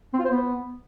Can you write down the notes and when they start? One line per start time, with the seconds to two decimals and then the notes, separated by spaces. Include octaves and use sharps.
0.13 C4
0.19 F4
0.24 C5
0.30 B3